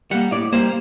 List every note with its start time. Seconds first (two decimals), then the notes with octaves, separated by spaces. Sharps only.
0.11 G3 A#3 F#5
0.31 A2 D5
0.53 G3 A#3 C5